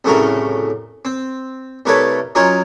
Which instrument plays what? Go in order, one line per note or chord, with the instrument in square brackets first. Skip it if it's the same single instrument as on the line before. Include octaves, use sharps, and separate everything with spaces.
[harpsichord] C2 A2 C#3 A3 F#4 A#4
C4
C2 A3 A#4 B4 C#5 A5
F#3 C#4 D#4 F4 A#4 C#5